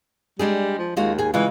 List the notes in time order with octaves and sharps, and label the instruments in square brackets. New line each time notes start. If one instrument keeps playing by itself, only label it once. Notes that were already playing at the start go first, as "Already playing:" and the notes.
[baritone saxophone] G3 [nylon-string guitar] G#3 D4 G#4
[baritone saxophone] F3
[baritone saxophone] D#2 [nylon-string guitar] G#3 F4 F#4
[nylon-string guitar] G#4 G#5
[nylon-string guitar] C#3 G#3 F4 [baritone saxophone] E3